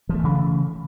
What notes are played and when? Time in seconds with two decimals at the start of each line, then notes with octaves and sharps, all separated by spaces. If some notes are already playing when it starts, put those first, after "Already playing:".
0.09 F3
0.14 A3
0.19 E3
0.24 C#3